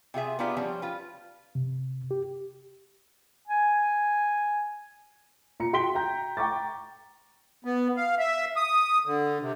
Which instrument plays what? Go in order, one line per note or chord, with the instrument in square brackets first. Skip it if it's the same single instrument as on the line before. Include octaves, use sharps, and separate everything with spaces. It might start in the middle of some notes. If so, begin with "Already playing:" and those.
[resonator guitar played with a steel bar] C3 F4 G#4 E5
B3 D4 D#4 F4 G4 G#4
F3 G3 C4 C#4
F4 B4
[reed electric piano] C3
G4
[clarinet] G#5
[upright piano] A#2 A#5 C#7
F#4 G5 C6 B6 D7 G7
G5 A#5 G6
G5 A#5 C#6 D6 A6
[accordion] B3
F5
E5
D#6
D3
C3